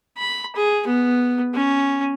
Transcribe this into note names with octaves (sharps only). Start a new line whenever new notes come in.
B5
G#4
B3
C#4